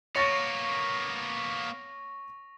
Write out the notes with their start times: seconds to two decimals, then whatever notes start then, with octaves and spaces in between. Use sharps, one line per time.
0.16 A#3 B3 C#5 C#6 A6 A#6 C#7 F7